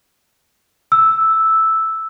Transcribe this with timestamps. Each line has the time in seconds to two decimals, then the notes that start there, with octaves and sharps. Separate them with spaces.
0.92 E6